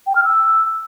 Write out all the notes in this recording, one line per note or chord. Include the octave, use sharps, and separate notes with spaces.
G5
F6
E6